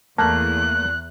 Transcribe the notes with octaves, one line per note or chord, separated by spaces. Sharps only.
E2 A3 A#3 A5 F#6